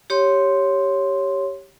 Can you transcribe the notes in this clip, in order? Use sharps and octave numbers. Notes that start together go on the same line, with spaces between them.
G4 C#5 C6